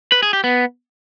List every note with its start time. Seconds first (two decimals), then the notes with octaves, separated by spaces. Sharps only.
0.12 B4
0.23 G#4
0.33 G4
0.44 B3